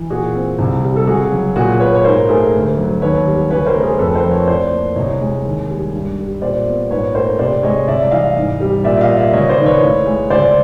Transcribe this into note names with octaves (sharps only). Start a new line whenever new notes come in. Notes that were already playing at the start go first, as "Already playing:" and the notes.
Already playing: E3
A#2 F#4 G#4
C4
C2
G3
A4
C#2 F#4 G#4
F#3
A#2 F#4 G#4
A#3 B4 C#5
C#5
G#2 A#4 C5
A3 G#4 A#4
D2
F#3
D#2 B4 C#5
G3
C#3 B4 C#5
A#4 C5
A3
G#4 A#4
F2 A4 B4
A#4 C5
F3
B4 C#5
A2 C5 D5
A#3
C2 C#5 D#5
G#3
D#2
G3
G2
G3
A#2 C5 D5
B3
G#2 B4 C#5
A3 A#4 C5
C3 C5 D5
G#3 C#5 D#5
C2 D5 E5
E3 D#5 F5
G#2
G3
A#2 D5 E5
D#5 F5
A#3
D5 E5
C#2 C#5 D#5
C5 D5
D#3
B4 C#5
A2
G#3
C#2 C5 D5